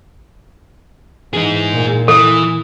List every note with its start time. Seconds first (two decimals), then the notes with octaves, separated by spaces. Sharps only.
1.33 E3 D#4 G#4
1.71 A#2
2.08 E3 A4